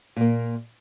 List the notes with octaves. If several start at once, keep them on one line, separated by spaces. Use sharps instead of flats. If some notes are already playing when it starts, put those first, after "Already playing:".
A#2 A#3